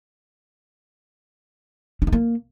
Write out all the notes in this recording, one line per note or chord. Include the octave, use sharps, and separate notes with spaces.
D4
D#4
A#3